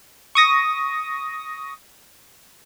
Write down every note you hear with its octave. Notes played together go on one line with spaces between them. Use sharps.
C#6 D#6 A#6